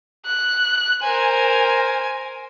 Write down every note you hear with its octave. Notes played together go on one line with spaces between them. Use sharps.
F#6
A#4 C5 G#5